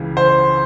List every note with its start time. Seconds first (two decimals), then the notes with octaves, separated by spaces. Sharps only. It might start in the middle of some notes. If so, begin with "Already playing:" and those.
Already playing: C#2 C#3 E3
0.17 C5